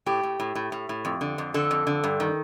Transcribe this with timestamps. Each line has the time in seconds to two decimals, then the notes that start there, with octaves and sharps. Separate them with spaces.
0.06 A2 G4
0.23 A2
0.40 A2
0.55 A2
0.72 A2
0.89 A2
1.05 F2
1.21 D3
1.38 F2
1.54 D3 A4
1.71 F2
1.87 D3
2.04 G2
2.20 D#3